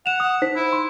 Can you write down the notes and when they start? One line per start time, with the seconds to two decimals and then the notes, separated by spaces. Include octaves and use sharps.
0.06 F#5 E7 F7
0.20 D#6
0.42 D#4 C5 B6
0.56 E4
0.73 C6